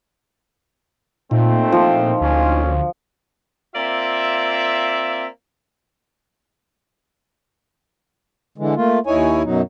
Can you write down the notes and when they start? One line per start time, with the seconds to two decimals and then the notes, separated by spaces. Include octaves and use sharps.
1.31 A#2 A3 C4 D#4 F4
1.72 F3
2.21 D2 A#2 C#4
3.75 A#3 C4 F4 D5 E5
8.58 D3 E3 G#3
8.76 A3 A#3 F4
9.07 D#2 D#4 E4 C#5 G#5
9.44 F#2 B2 F#3 D#4